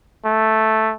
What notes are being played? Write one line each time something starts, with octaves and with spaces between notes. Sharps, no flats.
A3